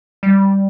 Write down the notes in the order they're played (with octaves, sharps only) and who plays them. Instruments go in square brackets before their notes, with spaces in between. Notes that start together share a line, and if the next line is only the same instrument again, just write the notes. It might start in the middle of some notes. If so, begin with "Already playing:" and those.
[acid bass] G3